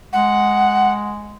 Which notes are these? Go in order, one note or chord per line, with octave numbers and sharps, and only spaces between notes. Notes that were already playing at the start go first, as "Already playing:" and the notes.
G#3 F#5